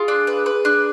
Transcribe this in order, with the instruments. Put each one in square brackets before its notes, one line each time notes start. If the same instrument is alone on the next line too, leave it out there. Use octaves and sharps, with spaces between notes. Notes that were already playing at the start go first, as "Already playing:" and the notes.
Already playing: [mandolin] F4 [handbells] G#4
[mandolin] D4
B4
B4
D4